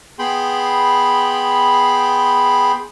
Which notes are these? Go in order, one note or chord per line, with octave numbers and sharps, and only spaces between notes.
B3 G#4 G5 B5 C6